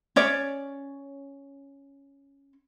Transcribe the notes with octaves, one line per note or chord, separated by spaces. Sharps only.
C#4 C#5 D5